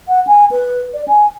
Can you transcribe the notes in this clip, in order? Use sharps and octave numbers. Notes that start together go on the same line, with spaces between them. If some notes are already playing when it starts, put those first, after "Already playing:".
F#5
G#5
B4
D5
G#5